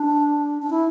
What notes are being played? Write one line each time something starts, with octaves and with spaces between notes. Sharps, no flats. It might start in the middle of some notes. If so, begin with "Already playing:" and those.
Already playing: D4
D4
E4